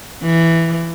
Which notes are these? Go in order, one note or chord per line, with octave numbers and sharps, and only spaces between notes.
E3